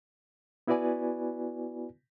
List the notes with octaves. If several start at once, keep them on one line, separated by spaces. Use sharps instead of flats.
B3 E4 F#4 B4 D5 G#5